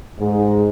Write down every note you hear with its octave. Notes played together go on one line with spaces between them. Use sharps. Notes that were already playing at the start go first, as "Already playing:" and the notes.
G#2